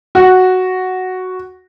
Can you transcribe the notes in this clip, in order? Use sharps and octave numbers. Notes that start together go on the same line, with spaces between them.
F#4